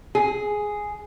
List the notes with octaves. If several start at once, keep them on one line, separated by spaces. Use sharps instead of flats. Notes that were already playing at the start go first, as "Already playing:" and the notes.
G#4